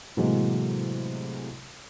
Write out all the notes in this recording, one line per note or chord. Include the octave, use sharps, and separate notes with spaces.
A2 C3 E3 F#3 G#3 A#3